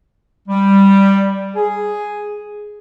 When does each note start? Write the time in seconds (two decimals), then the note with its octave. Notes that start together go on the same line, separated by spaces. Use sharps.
0.48 G3
1.56 G#4